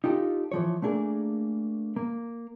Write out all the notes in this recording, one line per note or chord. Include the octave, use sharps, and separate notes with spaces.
D#4 F4 G4 A4
E3 F3 C#5
A3 A#3 D4 G#4 A#4
A#3